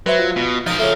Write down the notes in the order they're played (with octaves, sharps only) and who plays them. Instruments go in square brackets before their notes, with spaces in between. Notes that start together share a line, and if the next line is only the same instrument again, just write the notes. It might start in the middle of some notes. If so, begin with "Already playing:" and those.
[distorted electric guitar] F#3 [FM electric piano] B4 C5 E5
[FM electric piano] F4
[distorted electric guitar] B2
[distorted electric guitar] F3 A#4 [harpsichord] D#4
[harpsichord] C#3 A3